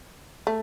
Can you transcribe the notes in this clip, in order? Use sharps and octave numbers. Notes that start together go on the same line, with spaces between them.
A3